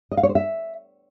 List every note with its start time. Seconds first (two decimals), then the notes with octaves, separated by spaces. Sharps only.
0.12 D#5
0.17 F5
0.23 C#5
0.29 C5
0.35 E5